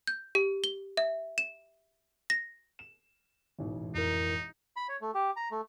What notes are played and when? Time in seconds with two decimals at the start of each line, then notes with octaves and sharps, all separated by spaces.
0.07 G6
0.35 G4
0.64 G7
0.97 E5
1.38 E7
2.30 A#6
2.79 E7
3.59 E1 A1 G#2
3.95 F2 D#4 E4 A#4
4.76 B5
4.89 C#5
5.01 A3
5.14 G4
5.36 A#5
5.51 A3